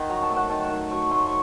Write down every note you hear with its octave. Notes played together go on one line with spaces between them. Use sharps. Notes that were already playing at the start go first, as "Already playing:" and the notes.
Already playing: D#3 F#5
F#3 A#5
A5
A3
F#5
D#3 A5
D#3
F#3 C#6
A3 C6
C#6